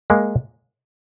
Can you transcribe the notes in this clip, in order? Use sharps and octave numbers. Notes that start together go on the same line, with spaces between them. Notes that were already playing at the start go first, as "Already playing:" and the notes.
G#3 A#3